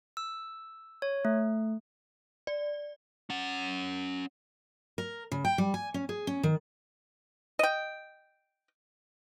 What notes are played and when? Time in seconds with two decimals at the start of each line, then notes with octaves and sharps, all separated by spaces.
0.17 E6
1.02 C#5
1.25 A3
2.47 D5
3.30 C#4 F#5
4.98 A#4
5.32 C#3
5.45 G5
5.58 G3
5.74 G#5
5.94 C#4
6.09 G#4
6.27 C#4
6.43 D#3
7.59 D#5 G5